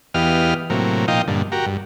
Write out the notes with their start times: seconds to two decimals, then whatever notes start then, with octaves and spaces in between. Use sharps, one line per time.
0.14 E2 B3 G4 D#5 F5 F6
0.70 A2 C3 F#3 A#3
1.08 A#2 F3 D#4 D#5 F5 G5
1.27 G2 A#2 D3
1.52 F#4 G4 A#4
1.66 G2